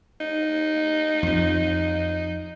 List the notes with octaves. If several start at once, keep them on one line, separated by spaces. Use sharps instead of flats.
D#4
F2 F3